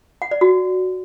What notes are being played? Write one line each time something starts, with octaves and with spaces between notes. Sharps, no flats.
F#5
D5
F#4